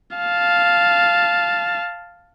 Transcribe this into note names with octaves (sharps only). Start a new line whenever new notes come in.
F5 A5